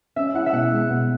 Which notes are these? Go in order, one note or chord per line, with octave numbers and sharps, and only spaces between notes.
C#4 E5
E4 F#5
E5
B2 F#5
G#3
B2